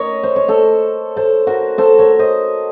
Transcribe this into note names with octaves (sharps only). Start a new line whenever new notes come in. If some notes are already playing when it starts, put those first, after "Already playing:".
Already playing: A#4 C#5 D#5
C5
C#5
A4 C5
A4 C5
F#4 A#4
A4 C5
A#4 C#5
C5 D#5